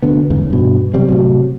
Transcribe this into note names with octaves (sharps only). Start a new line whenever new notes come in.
D2 D3 B3
E2 G#2 C#3
G2 B2
C3 F#3 G3 C4
A2 C3 F#3